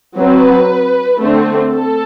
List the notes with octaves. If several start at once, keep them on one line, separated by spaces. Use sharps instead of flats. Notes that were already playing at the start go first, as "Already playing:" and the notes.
F#3 C4 B4
D3 A3 C4
A4